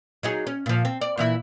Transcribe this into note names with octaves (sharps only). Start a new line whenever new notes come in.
F#3 D#4 G#4
C#4
A#2 F3
C4
D5
A#2 E3 E4